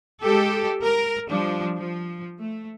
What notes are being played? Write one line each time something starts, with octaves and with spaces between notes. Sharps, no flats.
G#3 G4 A4
A#4
F3 G3 D4
F3
A3